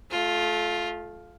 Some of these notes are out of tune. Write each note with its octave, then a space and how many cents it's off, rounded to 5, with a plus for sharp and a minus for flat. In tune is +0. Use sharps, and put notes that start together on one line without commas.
A3 -25 F4 +5